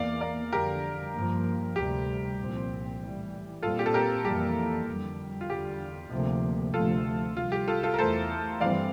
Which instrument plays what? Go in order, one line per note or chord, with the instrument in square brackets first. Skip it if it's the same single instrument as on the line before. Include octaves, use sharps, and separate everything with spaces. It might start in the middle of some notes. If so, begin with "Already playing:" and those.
Already playing: [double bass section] E2 E3 A#3 [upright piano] D5 F5
[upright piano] A#4 D5
[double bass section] F2 D3 G3 [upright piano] G4 A#4
[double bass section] G2 F3 A#3
[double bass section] D2 C3 G3 [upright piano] G4
[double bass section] C2 A#2 F3 C4
A2 E3 G3
[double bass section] A#2 G3 C4 [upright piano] F4 A4
[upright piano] G4
A4
G4 A#4
[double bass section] F2 E3 G3 A#3 [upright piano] G4
[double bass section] F2 D3 G3
[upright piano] F4
[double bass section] E2 D3 G3 [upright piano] G4
[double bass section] D2 C3 F3 A#3
[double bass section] D2 C3 F3 A3 [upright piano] F4 A4
[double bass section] C2 C3 G3 [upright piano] F4
[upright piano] G4
F4 A4
F4 A4
A#4
[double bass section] E2 E3 A3 [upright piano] A4 C5
[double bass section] G2 E3 G3 C4 [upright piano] D5 F5